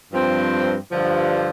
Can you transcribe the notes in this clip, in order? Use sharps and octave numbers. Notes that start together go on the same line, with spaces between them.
G2 F3 C4
G2 D3 F3